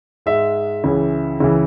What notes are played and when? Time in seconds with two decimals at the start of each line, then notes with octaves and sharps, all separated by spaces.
0.26 G#2 G#3 E5
0.84 C#2 C#3 E3
1.40 C#2 C#3 E3